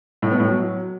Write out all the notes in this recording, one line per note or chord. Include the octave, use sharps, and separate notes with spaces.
A2
B3
A2
F#3